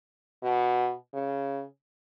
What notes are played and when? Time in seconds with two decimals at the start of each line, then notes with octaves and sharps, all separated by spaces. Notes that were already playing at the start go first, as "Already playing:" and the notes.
0.43 B2
1.13 C#3